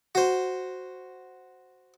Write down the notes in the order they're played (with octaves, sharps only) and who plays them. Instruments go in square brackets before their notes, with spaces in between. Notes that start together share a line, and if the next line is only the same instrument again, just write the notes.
[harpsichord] F#4 C5